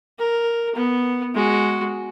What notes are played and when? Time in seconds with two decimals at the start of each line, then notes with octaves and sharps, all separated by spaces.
0.19 A#4
0.75 B3
1.34 G#3 F#4